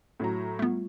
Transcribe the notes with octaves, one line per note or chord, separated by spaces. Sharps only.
A2 F#3 A#5
G3 A3 B3 F4